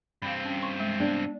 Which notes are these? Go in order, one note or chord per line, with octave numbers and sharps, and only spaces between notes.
G2 C4 F5 B5
C#4
C6 C#6
G#3
B3 D4